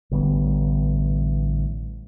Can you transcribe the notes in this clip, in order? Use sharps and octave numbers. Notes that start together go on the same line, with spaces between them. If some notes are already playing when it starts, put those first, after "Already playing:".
A1 D3 G3 B3